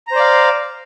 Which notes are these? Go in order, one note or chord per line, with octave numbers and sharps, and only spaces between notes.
C5 D5 F5 A#5